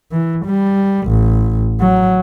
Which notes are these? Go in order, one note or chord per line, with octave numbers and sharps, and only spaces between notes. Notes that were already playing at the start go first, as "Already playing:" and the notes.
E3
G3
A1
F#3